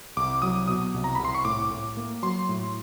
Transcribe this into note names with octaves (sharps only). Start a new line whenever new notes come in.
C2 D6
F#3 D#6
B2 D#6
C2
A#5
C2 B5
C6
C#6
A2 D6
A2
A#3
F#3 C6
A2